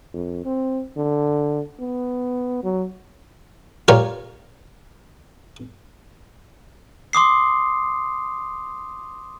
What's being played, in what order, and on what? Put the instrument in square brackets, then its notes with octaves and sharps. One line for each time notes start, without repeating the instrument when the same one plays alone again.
[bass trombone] F2
C4
D3
B3
F#3
[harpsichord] F4 G4 A#4 C#5 D5
[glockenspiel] C6 D6 D#6 C7